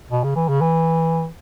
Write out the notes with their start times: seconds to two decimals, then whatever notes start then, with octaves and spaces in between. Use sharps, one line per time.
0.11 B2
0.24 C#3
0.36 E3
0.49 C#3
0.61 E3